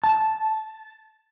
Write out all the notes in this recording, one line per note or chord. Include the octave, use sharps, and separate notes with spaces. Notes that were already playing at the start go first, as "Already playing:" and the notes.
A5